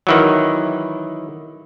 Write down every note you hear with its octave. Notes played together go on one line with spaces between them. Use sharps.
D#3 E3 F#3